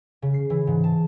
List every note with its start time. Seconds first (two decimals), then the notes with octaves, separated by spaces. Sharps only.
0.22 C#3
0.34 C7
0.50 E3
0.67 G#2
0.84 A5